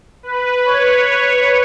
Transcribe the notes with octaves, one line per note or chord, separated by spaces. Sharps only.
B4
C#5